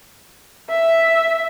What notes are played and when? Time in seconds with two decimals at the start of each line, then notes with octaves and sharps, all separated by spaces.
0.70 E5